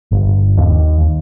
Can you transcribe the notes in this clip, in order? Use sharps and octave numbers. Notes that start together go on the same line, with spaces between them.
G1
D#2